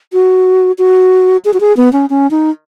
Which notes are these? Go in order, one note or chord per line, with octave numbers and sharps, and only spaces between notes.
F#4
F#4
G#4
F#4
G#4
B3
C#4
C#4
D#4